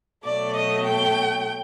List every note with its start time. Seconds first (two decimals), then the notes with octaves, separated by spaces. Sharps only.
0.24 B2 F#3 A3 D5
0.55 D#5
0.85 G5